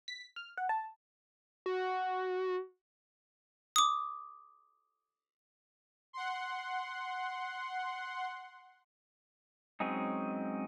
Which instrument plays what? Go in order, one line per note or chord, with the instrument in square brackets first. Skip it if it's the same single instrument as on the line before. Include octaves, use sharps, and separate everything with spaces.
[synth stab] B6
F6
F#5
A5
[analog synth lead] F#4
[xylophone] D6 D#6
[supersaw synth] F#5 C6
[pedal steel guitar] F#3 G#3 C4 C#4 D#4